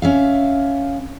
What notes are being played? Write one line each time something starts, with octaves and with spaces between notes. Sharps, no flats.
C#4 E5 F5